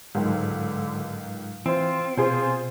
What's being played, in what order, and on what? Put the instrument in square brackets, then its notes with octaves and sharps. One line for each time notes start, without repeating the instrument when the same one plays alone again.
[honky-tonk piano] C#2 D#3 [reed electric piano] G#2 F#3 G#3 [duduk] D3
[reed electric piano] E3 C5 [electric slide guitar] C4 [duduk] F4
[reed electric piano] B2 [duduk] F4 [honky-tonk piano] G#4 C5